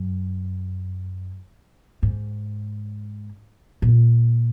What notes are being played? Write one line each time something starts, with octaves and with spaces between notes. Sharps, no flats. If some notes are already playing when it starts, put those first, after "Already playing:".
Already playing: F#2
G#2
A#2